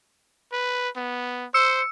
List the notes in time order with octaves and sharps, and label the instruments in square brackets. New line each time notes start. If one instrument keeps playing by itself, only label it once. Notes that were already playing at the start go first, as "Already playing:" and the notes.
[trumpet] B4
B3
[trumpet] C5 [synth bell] E6 C#7